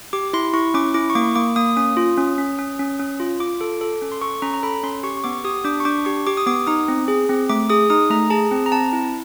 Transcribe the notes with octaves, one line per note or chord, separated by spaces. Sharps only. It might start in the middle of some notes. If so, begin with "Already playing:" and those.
G4 D6
E4 C6
E4 C#6
C#4 D6
E4 D6
C#6
A#3 D6
A#3 D6
A#3 D#6
C#4 D#6
F4
C#4
C#4
C#4
C#4
C#4
F4
F4 D6
A4
A4
C#4
C6
A4 C#6
C#4 A#5
A#5
A4 B5
C#4 C6
G4 C#6
C#6
B3 D6
G4 D#6
D4 D6
C#6
D4 D6
G4 C#6
G4 D6
D#6
B3 D6
D#4 D#6
C4
G#4
C4
A3 D6
G#4 D#6
D#4 D#6
A3 A#5
G#4 A5
C4
A#5
C4 A5
E4